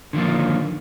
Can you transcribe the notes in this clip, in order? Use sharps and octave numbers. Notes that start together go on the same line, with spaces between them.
D3 D#3 F3 A#3